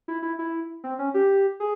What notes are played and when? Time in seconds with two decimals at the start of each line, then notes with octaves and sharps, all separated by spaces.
0.08 E4
0.22 E4
0.39 E4
0.84 C4
0.99 C#4
1.14 G4
1.60 G#4